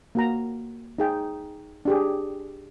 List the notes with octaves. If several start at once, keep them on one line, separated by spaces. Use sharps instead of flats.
A#3 F#4 A#5
D#4 G#4 G5
D4 G4 G#4